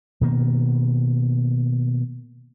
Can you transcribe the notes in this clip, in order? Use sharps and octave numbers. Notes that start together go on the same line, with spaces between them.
B2 D#3 A#3